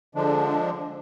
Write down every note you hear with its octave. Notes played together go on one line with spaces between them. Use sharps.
D3 F3 G#3 D4